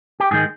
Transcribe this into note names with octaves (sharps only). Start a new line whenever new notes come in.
G4
G#2 D#3 G#3 G#4